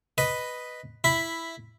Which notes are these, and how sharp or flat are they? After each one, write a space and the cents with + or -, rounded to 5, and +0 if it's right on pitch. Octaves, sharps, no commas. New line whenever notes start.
B4 +0 D#5 +0
E4 +0 B5 +0